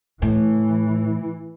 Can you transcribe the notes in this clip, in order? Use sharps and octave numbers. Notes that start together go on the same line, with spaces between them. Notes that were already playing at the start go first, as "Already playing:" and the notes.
A2 E3